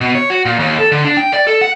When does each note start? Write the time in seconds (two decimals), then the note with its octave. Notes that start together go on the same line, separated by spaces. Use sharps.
0.01 B2
0.15 C#5
0.30 F#4
0.45 A#2
0.59 D#2
0.79 A4
0.92 D3
1.05 D4
1.17 G5
1.33 D5
1.47 A4
1.61 F#5